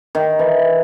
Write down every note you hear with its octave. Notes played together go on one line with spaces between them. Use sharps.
D#3
E3